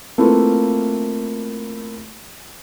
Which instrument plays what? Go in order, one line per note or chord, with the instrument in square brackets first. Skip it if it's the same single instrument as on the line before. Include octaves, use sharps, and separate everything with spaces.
[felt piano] A3 A#3 C4 E4 F4 B4